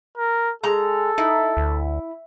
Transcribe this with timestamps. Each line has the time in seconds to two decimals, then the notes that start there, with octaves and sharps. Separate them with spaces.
0.18 A#4
0.63 G#3 A4 A#5
1.18 D#4 E4
1.57 D2